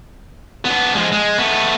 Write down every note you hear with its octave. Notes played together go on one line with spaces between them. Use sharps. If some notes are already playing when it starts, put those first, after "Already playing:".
B3 D4
F3 G#3
G#3
A3 B3